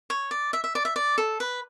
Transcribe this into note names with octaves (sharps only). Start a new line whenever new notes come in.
C#5
D5
E5
E5
D5
E5
D5
A4
B4